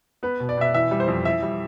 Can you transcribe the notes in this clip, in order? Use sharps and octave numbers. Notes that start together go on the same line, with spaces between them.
B3 B4
B2
D5
B2 E5
E3 E5
G3
C5
F2
E3 E5
G3